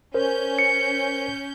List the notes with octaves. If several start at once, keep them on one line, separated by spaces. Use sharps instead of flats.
C#4 A#4 C5 G6
C#7